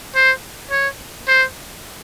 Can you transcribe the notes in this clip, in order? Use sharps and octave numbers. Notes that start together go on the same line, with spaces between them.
C5
C#5
C5